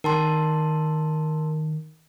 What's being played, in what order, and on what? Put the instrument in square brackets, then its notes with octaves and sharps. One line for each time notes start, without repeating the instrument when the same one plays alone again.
[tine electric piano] D#3 [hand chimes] A#4 A5 C6